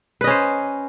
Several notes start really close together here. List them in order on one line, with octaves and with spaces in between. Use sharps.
B4 D#5 C#4 C5